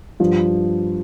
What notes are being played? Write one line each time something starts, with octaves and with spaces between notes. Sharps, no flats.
G2 F3